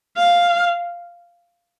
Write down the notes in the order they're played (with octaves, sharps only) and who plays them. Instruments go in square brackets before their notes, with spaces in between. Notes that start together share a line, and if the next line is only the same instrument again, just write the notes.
[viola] F5